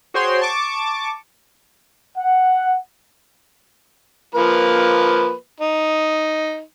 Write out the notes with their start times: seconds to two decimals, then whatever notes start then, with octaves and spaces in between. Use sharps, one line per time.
0.14 F#4 G#4 C5 C#5 G5 C6
0.41 A5 C#6 D6
2.18 F#5
4.35 F3 A#3 B4
5.60 D#4